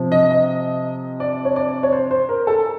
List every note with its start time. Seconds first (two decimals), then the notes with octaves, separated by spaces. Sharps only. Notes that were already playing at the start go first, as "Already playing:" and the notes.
Already playing: C3 F3
0.12 D#5
0.31 D#5
1.20 D5
1.45 C#5
1.56 D5
1.83 C#5
1.92 C5
2.11 C5
2.29 A#4
2.47 A4